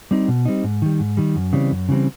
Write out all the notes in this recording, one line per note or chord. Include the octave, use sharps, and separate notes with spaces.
G3 C4 D#4
B2
G3 C4 D#4
G#2
D#3 G3
G#2
D#3 G3
F#2
C#3 E3 G3 C4
F#2
C#3 E3 G3 C4